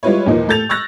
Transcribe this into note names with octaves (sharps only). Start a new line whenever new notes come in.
G3 G#3 E4 F4 B4 C#5
D#2 A#2 E3 F3 D#4 A#4
A2 A4 G6 A6 F7
C#6 E6 F#6 A6 A#6